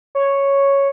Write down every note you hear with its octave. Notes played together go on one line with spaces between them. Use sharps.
C#5